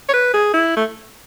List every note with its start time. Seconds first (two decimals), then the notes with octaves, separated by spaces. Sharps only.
0.09 C#5
0.13 B4
0.34 G#4
0.54 E4
0.77 A3